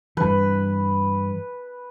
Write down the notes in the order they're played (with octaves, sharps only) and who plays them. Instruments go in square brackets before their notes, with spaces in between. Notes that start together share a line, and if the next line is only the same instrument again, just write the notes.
[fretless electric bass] G2 E3 [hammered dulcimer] B4